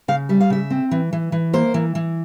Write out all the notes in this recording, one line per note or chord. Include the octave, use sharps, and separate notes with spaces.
C#3 F5
G3 E5
F5
C#3 E5
C4
E3
E3
E3
A#3 C5
E3
E3